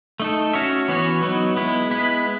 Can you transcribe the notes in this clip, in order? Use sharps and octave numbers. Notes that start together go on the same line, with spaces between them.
A3 D#4 A4
C#4 F#4 C#5 E5
E3 B3 F#4 C#5
F#3 B3 D#4
G#3 B3 E4
G#3 B3 E4 B4